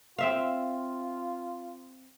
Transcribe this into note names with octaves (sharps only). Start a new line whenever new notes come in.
C4 F4 E5 F5